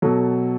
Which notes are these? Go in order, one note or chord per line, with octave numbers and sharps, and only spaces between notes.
B2 F#3 A4